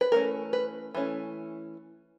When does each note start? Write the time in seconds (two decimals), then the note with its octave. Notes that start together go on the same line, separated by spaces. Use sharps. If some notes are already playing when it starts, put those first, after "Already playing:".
0.01 B4
0.12 E3 A3 C#4 A#4
0.53 B4
0.95 E3 A3 C#4